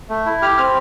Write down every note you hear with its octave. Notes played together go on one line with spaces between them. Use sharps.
A3
E4
G4 F6
C4 F6